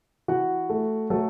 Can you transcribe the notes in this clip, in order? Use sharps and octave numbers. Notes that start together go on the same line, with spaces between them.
E3 F#4 F#5
A3
F#3 A3 A4